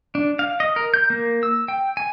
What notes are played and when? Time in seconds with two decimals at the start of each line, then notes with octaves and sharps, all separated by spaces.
0.15 D4
0.39 F5
0.60 D#5
0.76 A#4
0.94 G6
1.10 A#3
1.43 E6
1.68 G5
1.97 G#5